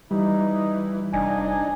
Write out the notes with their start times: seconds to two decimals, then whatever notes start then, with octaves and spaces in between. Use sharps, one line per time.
0.11 E3 G3 D#4
1.13 F1 D4 D#4 G#5